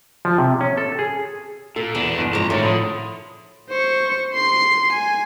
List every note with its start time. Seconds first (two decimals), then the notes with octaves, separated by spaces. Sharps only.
0.25 F3
0.38 C3
0.61 C#4
0.78 A4
0.99 G#4
1.76 A#2 A4
1.95 E2 B2 D4
2.18 G1
2.33 F2 G#2 A5 A#5
2.50 A2 D#3 A#4 C6 A6 C#7
2.62 D3 F3 C#5 B5 C6 D#6
3.69 C5 C#6
4.33 C6 C7
4.92 G#5